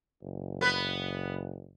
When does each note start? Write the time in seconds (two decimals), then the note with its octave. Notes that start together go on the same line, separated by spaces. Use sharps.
0.23 F#1
0.61 B3 B4